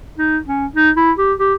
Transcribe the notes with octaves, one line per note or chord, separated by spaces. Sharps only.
D#4
C#4
D#4
E4
G4
G4